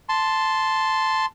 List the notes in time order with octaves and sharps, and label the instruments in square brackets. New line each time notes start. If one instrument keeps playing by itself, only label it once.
[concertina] A5 C6